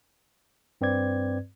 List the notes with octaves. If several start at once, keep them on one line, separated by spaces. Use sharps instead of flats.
G2 C4 B4 D5 G#6